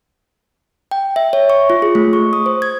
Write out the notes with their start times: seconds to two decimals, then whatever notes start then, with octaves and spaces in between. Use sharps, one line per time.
0.91 G5
1.16 E5
1.33 C#5
1.50 C#6
1.70 F4
1.82 G#4
1.95 A3
2.13 C#6
2.33 D#6
2.46 C5
2.62 G#6